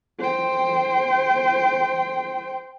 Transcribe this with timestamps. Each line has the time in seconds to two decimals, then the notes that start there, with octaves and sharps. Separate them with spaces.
0.20 C5 G5